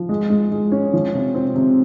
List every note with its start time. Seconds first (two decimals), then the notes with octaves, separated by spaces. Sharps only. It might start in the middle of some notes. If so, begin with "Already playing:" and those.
Already playing: F3
0.09 G#3
0.30 G#3
0.52 G#3
0.72 C#4
0.93 F3
1.14 C3
1.34 C4
1.56 C3